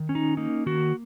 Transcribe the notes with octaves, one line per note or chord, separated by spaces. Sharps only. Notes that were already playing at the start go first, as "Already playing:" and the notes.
Already playing: D#3
C#4
D#4
A#3 D#4
D#3 F#4